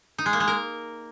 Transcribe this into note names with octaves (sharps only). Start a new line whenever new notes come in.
D#4
G#3
A#3
G#3
A#4